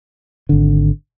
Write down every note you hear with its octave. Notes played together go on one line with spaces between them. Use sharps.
G#1 D3